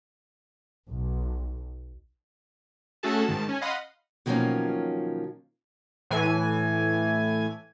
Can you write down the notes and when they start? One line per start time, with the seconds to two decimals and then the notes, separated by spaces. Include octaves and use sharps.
0.88 B1
3.03 A3 C#4 F#4 G#4 A4 A5
3.27 G#2 D#3 A5
3.49 C#4 G#5
3.61 D#5 F5 F#5 B5 C6 D#6
4.26 B2 D#3 F3 F#3 A#3 C#4
6.10 A2 E3 G#5